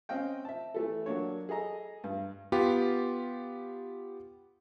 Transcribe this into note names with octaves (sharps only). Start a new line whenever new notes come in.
C4 C#4 D#5 F5 G5
E5 A5
E3 A3 A4
F#3 A#3 D4 C#5
G#4 A4 D#5 A#5
G2
B3 F4 G4